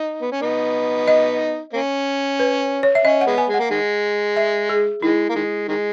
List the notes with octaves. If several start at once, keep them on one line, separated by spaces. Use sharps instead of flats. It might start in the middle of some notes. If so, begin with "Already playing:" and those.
Already playing: D#4
B3
C#4
B3 D#4
D#5
A#3 C#4
B4
C#5
E5
C#4 D#5
F#5
G#3 B3
G#5
G#3
F#5
A#3
D#3 G#3
E5
G#4
D#3 G#3 E4
A#3
D#3 G#3
D#3 G#3